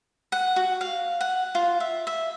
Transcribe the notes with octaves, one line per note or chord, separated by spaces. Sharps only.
F#5
F#4
F5
F#5
F4
E5
E5